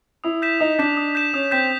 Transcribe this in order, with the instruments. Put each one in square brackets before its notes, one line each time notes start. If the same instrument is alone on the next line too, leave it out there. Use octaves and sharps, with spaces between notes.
[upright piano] E4 [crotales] D#6
[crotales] G6 B6 E7
[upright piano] D#4 [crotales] D#6
[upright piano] D4 [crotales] G6 B6 E7
[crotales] D#6
G6 B6 E7
[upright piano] C#4 [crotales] D#6
[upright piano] C4 [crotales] G6 B6 E7